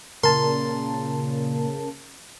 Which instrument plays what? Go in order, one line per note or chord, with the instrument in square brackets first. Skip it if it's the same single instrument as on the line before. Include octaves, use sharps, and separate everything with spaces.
[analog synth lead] A#2 [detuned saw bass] C#3 [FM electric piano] A#4 A5 [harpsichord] C6